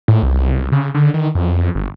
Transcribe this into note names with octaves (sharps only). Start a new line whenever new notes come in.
A2
C2
C#3
D3
D#3
F2
G1